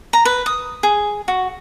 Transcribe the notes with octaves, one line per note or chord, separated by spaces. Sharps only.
A#5
B4
D#6
G#4
F#4